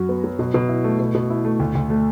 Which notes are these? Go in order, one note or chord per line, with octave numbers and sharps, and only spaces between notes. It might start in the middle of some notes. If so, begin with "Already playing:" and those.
Already playing: F#2 F#4
B3
F#3
B2
B2
E4
A3
B2
B2
E4
A3
D2
D2
A3